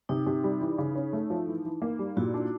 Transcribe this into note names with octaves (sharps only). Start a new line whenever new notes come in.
C3 D#4
C3
G3
E3
C#3
C#4
A3
F3
E3
E3
A#3
G3
A#2 E4 F#4
D4